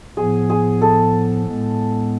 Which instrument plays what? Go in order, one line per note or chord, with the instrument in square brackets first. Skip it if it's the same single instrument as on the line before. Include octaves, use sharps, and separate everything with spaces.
[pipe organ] A2 F3 B3 [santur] G#4
[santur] G#4
A4
[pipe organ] A2 G#3 B3